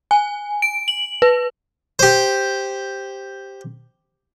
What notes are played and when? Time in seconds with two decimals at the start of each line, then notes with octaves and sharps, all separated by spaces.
0.11 G#5
0.62 D7
0.88 F#7
1.22 B4
1.99 G4 C5